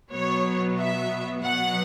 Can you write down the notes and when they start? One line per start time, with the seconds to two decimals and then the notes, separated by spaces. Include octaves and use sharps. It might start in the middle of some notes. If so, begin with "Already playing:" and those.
0.11 B2 F#3 B3 C#5
0.77 E5
1.43 B2 F#3 B3 F#5